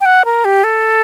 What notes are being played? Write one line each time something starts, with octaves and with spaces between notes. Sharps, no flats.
G5
F#5
A#4
G4
A4